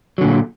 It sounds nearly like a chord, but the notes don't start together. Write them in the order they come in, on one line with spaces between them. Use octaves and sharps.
F#3 D3 A#2